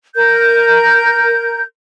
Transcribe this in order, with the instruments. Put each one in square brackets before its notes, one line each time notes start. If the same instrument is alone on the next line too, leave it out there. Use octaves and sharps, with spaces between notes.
[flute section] A#4 G6